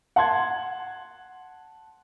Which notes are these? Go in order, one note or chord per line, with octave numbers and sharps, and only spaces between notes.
F#5 A5 C6 G#6